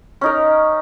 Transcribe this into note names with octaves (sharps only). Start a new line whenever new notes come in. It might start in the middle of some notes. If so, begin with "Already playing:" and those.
C#4 D#4 A#4